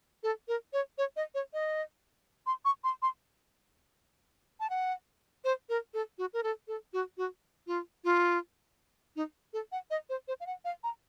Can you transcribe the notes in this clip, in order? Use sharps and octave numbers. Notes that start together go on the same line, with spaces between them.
A4
A#4
C#5
C#5
D#5
C#5
D#5
C6
C#6
C6
C6
A5
F#5
C5
A#4
A4
F#4
A#4
A4
A4
F#4
F#4
F4
F4
D#4
A4
F#5
D#5
C5
C5
F5
F#5
F5
A#5